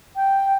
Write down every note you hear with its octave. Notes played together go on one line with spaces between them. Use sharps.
G5